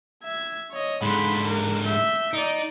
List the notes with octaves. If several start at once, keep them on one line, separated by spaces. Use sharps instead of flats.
E5 G#6
C#5 D#5
G#2 D3 B5 C6
A#4
E5 G6
D#4 D5 D7